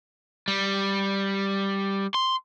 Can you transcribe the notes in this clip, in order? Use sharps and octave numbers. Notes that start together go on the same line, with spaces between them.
G3
C6